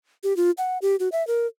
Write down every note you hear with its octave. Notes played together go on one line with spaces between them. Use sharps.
G4
F4
F#5
G4
F#4
E5
A#4